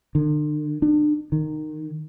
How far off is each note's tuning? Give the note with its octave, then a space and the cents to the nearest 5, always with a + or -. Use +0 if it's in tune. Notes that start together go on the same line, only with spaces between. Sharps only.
D3 +40
D4 +35
D#3 -15